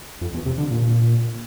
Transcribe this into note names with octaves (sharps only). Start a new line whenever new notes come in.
F2
E2
C3
D3
A#2